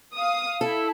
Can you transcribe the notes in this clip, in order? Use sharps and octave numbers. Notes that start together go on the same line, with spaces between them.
F5 D#6
E4 A4